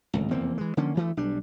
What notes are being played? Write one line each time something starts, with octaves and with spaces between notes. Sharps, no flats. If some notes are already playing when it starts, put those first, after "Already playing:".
D1 G#1 C#2
F1 E2 A#3 C4
E3 G#3
D3 F3 A#3 C#4
D2 E3 A3
B1 G3 D4